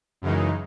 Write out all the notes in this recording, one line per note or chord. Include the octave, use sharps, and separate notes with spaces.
F#2 C#3 E3 G#3 D#4